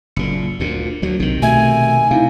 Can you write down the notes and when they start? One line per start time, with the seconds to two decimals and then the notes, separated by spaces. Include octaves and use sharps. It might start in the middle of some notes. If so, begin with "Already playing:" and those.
0.16 F#1 A#2 C#7
0.60 D2 A#2
1.02 D2 F#3
1.20 B1 C3 D#3
1.42 B2 A3 E5 G#5
2.11 C3 D#4 E4 F5